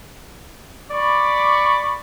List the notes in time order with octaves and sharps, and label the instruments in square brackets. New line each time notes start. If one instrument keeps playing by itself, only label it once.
[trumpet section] D5 B5 C#6 D6